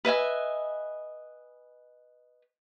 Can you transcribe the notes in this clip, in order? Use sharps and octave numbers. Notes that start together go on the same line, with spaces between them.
B4 D#5 E5 G#5